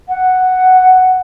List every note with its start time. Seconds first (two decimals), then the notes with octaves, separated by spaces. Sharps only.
0.09 F#5